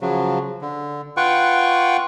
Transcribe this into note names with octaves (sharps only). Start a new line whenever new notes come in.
C#3 F3 F#3
D3
F4 B4 F#5 G5 C#6